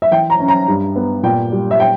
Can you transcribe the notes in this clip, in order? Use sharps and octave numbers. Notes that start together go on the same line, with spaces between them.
E5
E3 G5
A#5
C#4
A#5
G2
B3
A#2 G5
G3
E5
G5